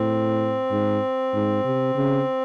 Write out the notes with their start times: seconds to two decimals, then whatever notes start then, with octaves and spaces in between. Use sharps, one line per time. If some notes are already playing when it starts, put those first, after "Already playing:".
Already playing: A2 C4
0.71 G#2
1.33 G#2
1.64 C3
1.95 C#3